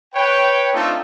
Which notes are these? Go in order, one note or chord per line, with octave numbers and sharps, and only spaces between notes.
B4 C#5 G5
A3 C4 D4 D#4 F4 A4